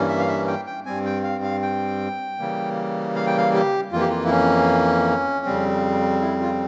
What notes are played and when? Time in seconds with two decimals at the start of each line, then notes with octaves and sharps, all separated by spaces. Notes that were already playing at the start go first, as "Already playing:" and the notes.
Already playing: G2 E3 G3 A#3 C#4
0.09 E5
0.19 F5
0.28 E5
0.47 G5
0.67 G5
0.86 G2 G3 C4 G#5
1.05 G5
1.24 F5
1.43 F5
1.62 G5
2.39 C#3 E3 G3 A#3
3.15 F5
3.27 G5
3.38 F5
3.54 G4
3.92 F2 E3 A#3 F4
4.00 G4
4.10 F4
4.25 E4
4.31 C#4
5.46 F2 C#3 G3 C4
6.22 E4
6.41 F4